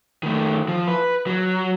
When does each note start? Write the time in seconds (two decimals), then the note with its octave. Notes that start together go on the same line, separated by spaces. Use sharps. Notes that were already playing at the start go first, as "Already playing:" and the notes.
0.23 D#3 A3
0.68 F3
0.88 B4
1.27 F#3